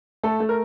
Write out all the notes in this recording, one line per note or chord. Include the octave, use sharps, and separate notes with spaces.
A3 A4
A3
A#4